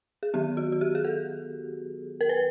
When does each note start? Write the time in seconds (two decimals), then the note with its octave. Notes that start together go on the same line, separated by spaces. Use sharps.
0.23 G#4
0.34 D#3 F#3 B3 G4
0.57 F#4
0.72 F#4
0.81 G4
0.95 G#4
1.04 A4
2.21 A#4
2.29 B4